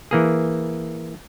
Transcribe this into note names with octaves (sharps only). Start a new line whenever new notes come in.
E3 A#3 G#4